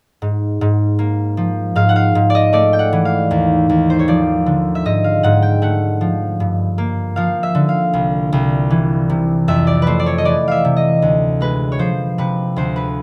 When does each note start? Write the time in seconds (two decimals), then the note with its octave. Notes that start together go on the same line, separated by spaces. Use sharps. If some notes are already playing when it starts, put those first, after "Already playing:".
0.22 G#2
0.61 G#2
0.99 A#3
1.37 F3
1.76 G#2 F5
1.89 F#5
1.96 F5
2.15 G#2
2.30 D5 D#5
2.53 A3 D5
2.73 G5
2.79 F#5
2.93 E3
3.05 F5
3.31 D#2
3.69 D#2
3.90 C5
3.99 C#5
4.08 F3 D5
4.46 D3
4.75 E5
4.86 G#2 D#5
5.04 F5
5.23 G#2 F#5
5.42 G5
5.62 A3 F#5
6.01 F3
6.40 G2
6.78 A#3
7.16 F3 F5
7.43 E5
7.55 D3
7.69 F5
7.93 C2
8.33 C2
8.70 E3
9.10 C3
9.48 F2 E5
9.67 D5
9.82 A3 B4 C5
9.99 D5
10.06 C#5
10.18 D#5
10.25 E3 D5
10.48 E5 F5
10.65 C3
10.77 D#5
11.02 D2
11.41 G#3 B4
11.72 C#5
11.79 F3 C5
12.18 C3 B4
12.56 D2 C5
12.76 B4